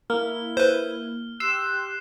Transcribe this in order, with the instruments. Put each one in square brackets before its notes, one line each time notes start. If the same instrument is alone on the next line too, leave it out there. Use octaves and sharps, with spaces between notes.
[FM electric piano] A#3 [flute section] E4 [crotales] F6
[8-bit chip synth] B4 C5
[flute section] G4 C6 F#6 [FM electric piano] E6 [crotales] C7 E7